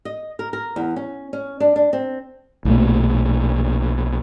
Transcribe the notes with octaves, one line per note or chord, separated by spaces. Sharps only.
D#5
A#4
A#4
E2
C#4
C#4
D4
D4
C4
B1 A#2 D3 A3